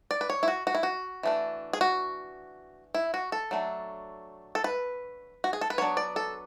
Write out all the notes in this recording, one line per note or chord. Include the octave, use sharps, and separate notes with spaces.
D5
B4
C#5
E4
F#4
F#4
E4
F#4
E3 A3 D4
G#4
F#4
E4
F#4
A4
F#3 A3 D4
A4
B4
F#4
G#4
A4
B4
F#3 B3 D4 C#5
D5
A4